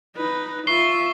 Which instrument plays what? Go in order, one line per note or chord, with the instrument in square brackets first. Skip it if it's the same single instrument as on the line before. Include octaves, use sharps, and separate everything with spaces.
[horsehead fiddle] D#4 B4
[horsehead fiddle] F4 E5 [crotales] C#6 C7 G7